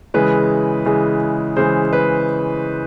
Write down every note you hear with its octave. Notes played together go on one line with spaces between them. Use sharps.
C#3 E3 G#3 B4
C#3 E3 G#3
C#3 E3 G#3 C5
B4